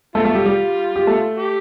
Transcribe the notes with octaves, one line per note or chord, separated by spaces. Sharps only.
A3 C4 F4 A4
A3 A4
G3 G4
G3 G4
G4
A3 A4
G4